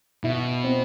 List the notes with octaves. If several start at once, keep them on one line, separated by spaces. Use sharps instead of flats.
B2 E4
C4